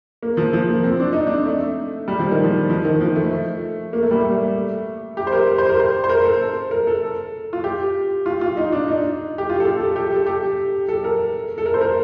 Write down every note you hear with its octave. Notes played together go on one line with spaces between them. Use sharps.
A#3
F3
F3
A#3
C4
D4
D#4
D4
A3
G3
F3
D#3
F3
F3
D#3
F3
A3
A#3
A3
G3
A3
G4
C5
A#4
C5
A#4
C5
C5
A#4
A4
A#4
A4
F4
G4
F4
F4
D#4
D4
D#4
G4
F4
A4
G4
A4
G4
A4
G4
A4
A#4
A4
A#4
C5
A#4